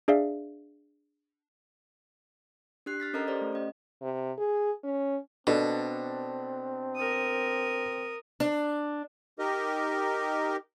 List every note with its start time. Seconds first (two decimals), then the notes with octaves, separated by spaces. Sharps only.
0.08 D4 G#4 D5 E5 F5
2.86 D4 G4 F#6 C7
3.00 F6 A6 B6
3.13 C#4 A4 A#4 D#5 A#5 F6
3.28 G4 C5 D5
3.41 A3
3.53 C#4 D#5
4.01 C3
4.38 G#4
4.84 C#4
5.47 B2 C4 D4 A4
6.96 A#4 D#6
8.40 D4
9.39 D#4 G4 A#4 D#5